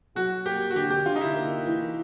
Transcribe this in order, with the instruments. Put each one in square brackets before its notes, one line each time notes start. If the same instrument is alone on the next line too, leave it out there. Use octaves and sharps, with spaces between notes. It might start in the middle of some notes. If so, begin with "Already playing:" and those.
[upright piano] F#3 [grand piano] F#4
[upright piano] A#3 [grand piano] G4
[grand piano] F#4
[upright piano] D3 [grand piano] G4
[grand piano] G4
[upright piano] D3 [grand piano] F4
[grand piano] D#4
E4
[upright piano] A#3
E3